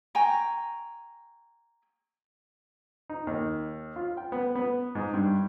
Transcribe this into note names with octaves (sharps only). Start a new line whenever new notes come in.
G5 G#5 A#5 C#6
D#4
D#2
F4
G5
B3
B3
G#2
G2